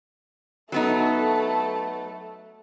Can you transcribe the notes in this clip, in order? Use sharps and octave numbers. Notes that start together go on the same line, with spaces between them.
F#3 A3 B3 D#4 A4